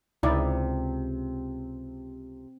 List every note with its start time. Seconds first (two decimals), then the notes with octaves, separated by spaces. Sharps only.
0.23 C#2 C3 D#4 E4 D5